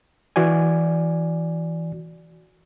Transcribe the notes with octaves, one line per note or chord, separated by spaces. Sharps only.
E3 F#4 D5 G#5